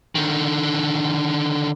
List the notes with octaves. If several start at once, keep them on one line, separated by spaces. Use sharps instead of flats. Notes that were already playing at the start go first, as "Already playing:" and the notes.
D3 D#3